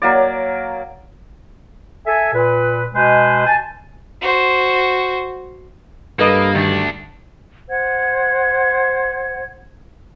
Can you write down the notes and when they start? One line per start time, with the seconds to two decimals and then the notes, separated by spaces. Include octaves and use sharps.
0.02 F#3 A#3 D5
2.07 A4 E5 G#5
2.34 A#2 B4
2.94 B2 G#3 B4 C5 G#5
3.47 G#5 A5
4.22 F#4 C5
6.19 G2 A#3 A4 B4 D#5
6.55 D2 D#3 D4
7.68 C5 F#5 G#6